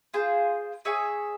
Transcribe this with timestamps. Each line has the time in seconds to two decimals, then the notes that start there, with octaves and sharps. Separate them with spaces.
0.14 F4 G#4 C5
0.85 G#4 C#5 E5 G#5